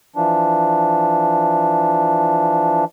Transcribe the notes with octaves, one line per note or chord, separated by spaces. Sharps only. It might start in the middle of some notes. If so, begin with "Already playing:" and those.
E3 F3 D4